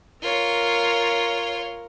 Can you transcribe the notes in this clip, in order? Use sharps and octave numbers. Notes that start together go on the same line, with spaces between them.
F4 A#4 C#5